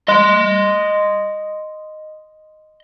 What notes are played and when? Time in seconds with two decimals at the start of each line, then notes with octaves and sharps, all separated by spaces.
0.08 D#5 C6